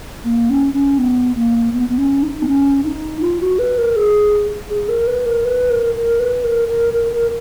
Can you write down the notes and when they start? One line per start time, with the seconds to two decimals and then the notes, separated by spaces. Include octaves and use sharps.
0.25 A#3
0.50 C#4
0.74 C#4
0.98 B3
1.36 A#3
1.73 B3
1.89 B3
1.98 C#4
2.23 D#4
2.42 B3
2.47 C#4
2.84 D#4
3.21 F4
3.41 F#4
3.59 B4
3.78 A#4
3.96 G#4
4.70 G#4
4.89 A#4
5.07 B4
5.26 A#4
5.45 B4
5.70 A#4
5.95 A#4
6.20 B4
6.44 A#4
6.68 A#4
6.94 A#4
7.12 A#4